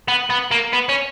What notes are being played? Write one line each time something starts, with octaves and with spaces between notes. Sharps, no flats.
B3
B3
A#3
B3
C#4